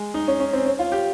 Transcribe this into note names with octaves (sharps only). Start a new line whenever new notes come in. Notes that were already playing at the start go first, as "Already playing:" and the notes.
Already playing: G#3
D#4
C#4
C#4
C4
C#4
F4
G4